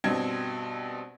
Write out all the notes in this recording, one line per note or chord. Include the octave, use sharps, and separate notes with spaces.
G2 B2 C4 D#5 G#6